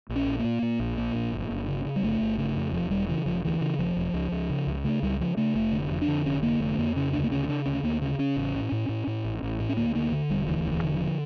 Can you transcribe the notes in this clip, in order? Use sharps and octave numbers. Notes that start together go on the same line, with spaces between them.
A#1
C#4
A#2
A#2 A#3
A#2
A#1
A#2
A#1
G1
G1
C#3
C#3
G3
G1 A3
G1
C#3 A3
F2
E1 F3
E1 G3
C#3 E3
E1 F3
D2 E3
C#3
E1 F3
E1
C#2
C#2
C#3
C#2
C#3 A3
C#2 G3
C#3 F3
C#3 A3
F1 A3
D3
F2
D4
D3
F1 C#4
D3 A#3
F1 A3
C#4
F2 A#3
C#3 C#4
D2 D4
A#3
C#3 C#4
C#3 D4
D2 C#4
D2 A#3
C#3 C#4
C#3 C#4
A1
A2
A2
A2
A2
A1
A1
A2
C#4
D2 A#3
D3 A#3
D3
E1 G3
D2 E3
E1
E3
D3
F3
D3